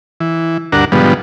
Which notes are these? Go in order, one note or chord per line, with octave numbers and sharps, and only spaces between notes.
E3
D2 G2 D4 A#4 F#5
G#2 B2 D3 F3 G3 B3